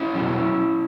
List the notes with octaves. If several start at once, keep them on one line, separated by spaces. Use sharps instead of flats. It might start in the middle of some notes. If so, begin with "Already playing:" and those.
Already playing: C#4 E4
B2 F#3